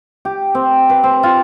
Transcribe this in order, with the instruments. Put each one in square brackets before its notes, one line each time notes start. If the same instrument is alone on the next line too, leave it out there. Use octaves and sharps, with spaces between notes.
[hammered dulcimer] G4
C4
B4
C4
F4